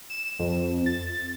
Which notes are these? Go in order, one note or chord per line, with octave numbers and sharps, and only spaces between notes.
E7
F2
A6